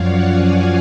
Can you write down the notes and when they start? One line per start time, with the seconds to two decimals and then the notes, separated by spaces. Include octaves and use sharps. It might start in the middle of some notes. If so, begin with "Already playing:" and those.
Already playing: F#2 F3 C#5 D5 F5 F#5
0.28 F5 G#5